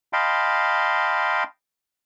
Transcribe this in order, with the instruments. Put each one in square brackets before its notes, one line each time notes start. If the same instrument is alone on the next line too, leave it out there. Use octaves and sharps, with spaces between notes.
[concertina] D#5 F5 G5 A5 B5 C6